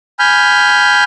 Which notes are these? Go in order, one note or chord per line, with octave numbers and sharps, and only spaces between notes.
G#5 B5 F6 G6